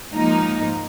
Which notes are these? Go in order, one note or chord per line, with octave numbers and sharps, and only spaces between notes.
G#2 F3 A#3 D#4